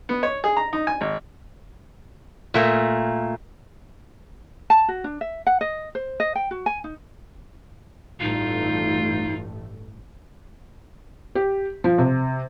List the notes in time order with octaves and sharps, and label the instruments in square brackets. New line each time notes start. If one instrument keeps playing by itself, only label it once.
[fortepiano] B3
C#5
G#4
A#5
D#4
G#5
G#1
[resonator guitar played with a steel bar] A#2 A3 A#3
[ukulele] A5
F#4
D4
E5
F#5
D#5
C5
D#5
G5
F#4
G#5
D#4
[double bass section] A1 G2 A3 [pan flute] D#4 [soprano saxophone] F4
[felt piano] G4
F3
C3